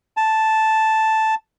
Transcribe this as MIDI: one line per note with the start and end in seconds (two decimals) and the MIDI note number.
0.17 1.35 81